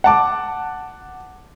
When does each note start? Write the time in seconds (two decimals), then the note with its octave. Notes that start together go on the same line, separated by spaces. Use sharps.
0.04 F#5 A5 D6